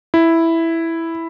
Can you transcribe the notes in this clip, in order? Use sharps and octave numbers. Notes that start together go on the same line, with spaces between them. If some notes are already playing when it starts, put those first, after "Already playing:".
E4